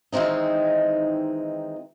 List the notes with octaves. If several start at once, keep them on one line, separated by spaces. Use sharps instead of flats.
D#3 E3 G#3 C4 D#4